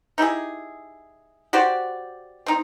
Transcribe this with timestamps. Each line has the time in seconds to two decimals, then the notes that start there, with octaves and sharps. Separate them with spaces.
0.18 D#4 E4 G4 G#4
1.53 F#4 G4 C5 D5
2.46 C4 D#4